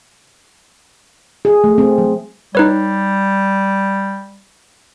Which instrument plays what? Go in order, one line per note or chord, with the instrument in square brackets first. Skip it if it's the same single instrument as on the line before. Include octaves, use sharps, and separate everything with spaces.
[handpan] G#4
A3
C4
F#3
[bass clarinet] G3 [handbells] D#4 B4 C#5